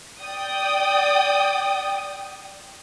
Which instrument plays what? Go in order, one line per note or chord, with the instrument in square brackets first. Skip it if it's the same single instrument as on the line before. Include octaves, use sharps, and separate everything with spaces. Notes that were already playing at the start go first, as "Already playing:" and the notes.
[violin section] D5 G5 D#6